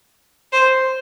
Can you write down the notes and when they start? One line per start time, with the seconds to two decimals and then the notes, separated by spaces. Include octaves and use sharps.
0.52 C5